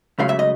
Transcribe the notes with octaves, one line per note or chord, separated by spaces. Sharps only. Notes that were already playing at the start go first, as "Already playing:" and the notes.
C#2 C#3 F#3 A3 F5
E5
D#5